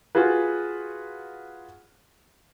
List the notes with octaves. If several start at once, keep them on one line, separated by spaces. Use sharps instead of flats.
F4 F#4 G#4 B4